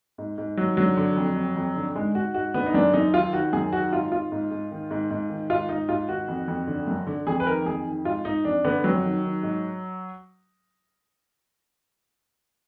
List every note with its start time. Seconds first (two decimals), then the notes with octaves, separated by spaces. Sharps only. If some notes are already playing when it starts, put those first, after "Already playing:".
0.18 G#2
0.38 G#2
0.57 D#3 F#3
0.77 D3 F#3
0.97 D3
1.17 F2
1.36 F2
1.56 F2
1.76 D3
1.95 G#2 G#3
2.15 G#2 F#4
2.34 G#2 F#4
2.54 D3 B3
2.66 D#4
2.74 F#2 D4
2.93 F#2 D#4
3.14 D#3 F4
3.33 D#3 F#4
3.53 F#2 G#4
3.72 D#3 F#4
3.93 G#2 F4
4.12 D#3 F4
4.32 G#2
4.51 G#2
4.71 D#3
4.91 G#2
5.10 G#2
5.30 D#3
5.50 G#2 F4
5.69 G#2 D#4
5.89 G#2 F4
6.08 D#3 F#4
6.28 F2
6.48 F2
6.67 D3
6.88 F#2
7.07 D3
7.27 F2 G#4
7.40 B4
7.46 D#3 A#4
7.66 F2 G#4
7.86 D#3
8.05 G#2 F4
8.25 G#2 D#4
8.45 F2 D4
8.65 D3 B3
8.84 F2 F#3
9.04 D#3
9.23 D#3
9.43 G#2